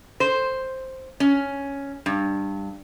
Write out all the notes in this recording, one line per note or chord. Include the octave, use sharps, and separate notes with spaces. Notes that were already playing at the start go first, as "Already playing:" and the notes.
C5
C#4
G2